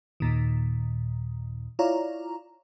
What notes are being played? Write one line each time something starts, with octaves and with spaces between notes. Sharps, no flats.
D#2 A#2 D#3
E4 F4 C#5 D5 F5 A#5